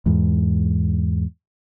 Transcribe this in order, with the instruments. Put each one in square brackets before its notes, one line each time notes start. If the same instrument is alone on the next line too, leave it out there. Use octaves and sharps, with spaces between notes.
[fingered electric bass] E2 G#2